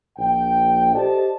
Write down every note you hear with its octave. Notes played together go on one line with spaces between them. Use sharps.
A#1 G5
G4 A4 C5 D5 D#5 A5